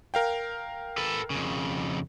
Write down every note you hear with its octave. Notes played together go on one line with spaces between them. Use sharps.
A#4 F5 G5
A4 B4
F2 C#3